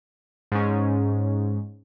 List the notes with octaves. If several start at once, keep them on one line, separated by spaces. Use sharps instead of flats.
G#2 C#4